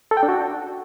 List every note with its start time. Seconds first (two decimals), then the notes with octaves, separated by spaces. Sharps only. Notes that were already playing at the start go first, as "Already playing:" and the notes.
0.11 A4
0.17 G5
0.23 D4
0.29 F#4